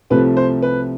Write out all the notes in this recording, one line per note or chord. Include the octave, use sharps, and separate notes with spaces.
C2 C3 F3 A3 B4
C5
B4